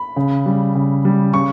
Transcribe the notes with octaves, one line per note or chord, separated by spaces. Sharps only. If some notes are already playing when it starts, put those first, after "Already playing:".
Already playing: B5
C#3
G3
C#3
G3
C#3 C#6